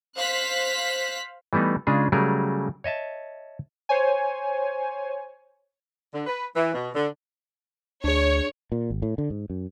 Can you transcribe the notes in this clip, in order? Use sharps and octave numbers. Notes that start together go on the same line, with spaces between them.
C5 F5 F#6 B6
E3 G3 A3 B3 D#4
C#3 G#3 D4 F4 G#4
C#3 F#3 G3 A3 G#4 A#4
C#5 D#5 E5 A5
C5 C#5 G#5
D3
B4
E3
B2
D3
D2 D4 G#4 C#5
A#2
G#1
A2
D3
G#2
F#2